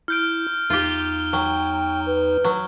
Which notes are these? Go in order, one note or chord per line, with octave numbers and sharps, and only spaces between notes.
E4 F6 G6 D7
E2 D#4 F4 G4 G7
F#3 G5
B4
F#3